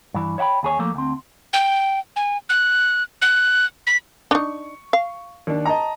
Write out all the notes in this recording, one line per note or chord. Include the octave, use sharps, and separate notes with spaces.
G2 E3
C#5 E5 F#5 G5 B5
D#2 G#4 C#5 G#5
F3 A3 A#3
D2 C4
G5
G#5
F#6
F#6
B6
D4 D#4 C#6
F5
D#2 D4
D#5 A5 A#5